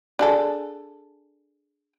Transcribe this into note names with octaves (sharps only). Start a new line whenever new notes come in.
D4 G#4 A4